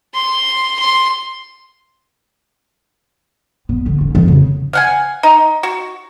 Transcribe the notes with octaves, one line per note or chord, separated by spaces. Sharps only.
C6
C6
B3
D3
C#4
F2
C#3
F5 F#5 G#5
D#4
F#4